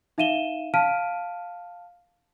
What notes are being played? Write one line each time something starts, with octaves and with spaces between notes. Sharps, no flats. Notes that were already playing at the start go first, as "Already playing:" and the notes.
D#4 E5 F5 D#7 E7 G7
F5 A5 F6 B6 D7 D#7